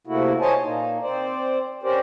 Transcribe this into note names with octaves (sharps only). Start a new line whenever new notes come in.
C3 A3 A#3 E4 F#4
C5 C#5 D#5 G#5 A5
A#2 A#3 D#4
C4 C5 D5
C#4 G4 A#4 C5 D5